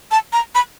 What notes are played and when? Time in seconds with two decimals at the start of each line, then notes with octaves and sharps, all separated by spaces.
0.11 A5
0.33 A#5
0.55 B5